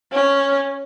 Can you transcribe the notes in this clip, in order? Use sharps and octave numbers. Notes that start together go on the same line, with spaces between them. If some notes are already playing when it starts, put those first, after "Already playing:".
C#4